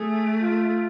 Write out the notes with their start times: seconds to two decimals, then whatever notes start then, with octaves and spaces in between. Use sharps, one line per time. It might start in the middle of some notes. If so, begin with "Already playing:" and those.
Already playing: A3 G#4
0.40 F4